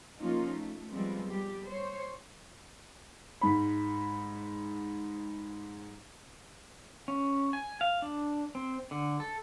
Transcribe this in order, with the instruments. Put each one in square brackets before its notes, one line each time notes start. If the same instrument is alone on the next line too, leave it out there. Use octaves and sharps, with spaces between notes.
[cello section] F3 A#3 C#4 D#4 F4
A3
F3 G3 G#3 B3 C4
G3 G4
C5 C#5
[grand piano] G#2 B5
[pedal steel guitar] C#4
G#5
F5
D4
C4
D3
A4